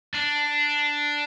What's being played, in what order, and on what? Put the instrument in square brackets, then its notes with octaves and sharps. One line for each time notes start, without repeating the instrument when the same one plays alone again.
[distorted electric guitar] D4